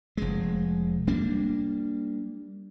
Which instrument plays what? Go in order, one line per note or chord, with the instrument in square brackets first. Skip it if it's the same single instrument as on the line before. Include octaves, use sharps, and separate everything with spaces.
[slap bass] F1 G#3
G3 A#3 D4